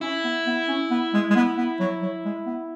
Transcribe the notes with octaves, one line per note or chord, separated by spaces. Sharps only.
C#4 E4
B3
B3
C#4
B3
G#3
G#3
B3
B3
F#3
F#3
G#3
B3